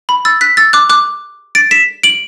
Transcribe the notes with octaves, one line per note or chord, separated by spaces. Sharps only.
B5
E6 A6
F#6 B6
E6 A6
D6 F#6
D6 F#6
A6 D7
B6 E7
D7 F#7